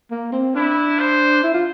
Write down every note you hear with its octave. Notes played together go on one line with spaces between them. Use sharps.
A#3
C4
D4 E4
C5
E4
F4